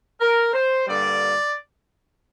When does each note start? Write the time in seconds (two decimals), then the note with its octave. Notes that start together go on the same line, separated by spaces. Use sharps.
0.21 A#4
0.54 C5
0.87 G2 D3 G3 A#3 D5